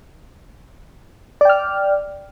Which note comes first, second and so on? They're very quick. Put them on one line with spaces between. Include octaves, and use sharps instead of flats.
D5 G5 F6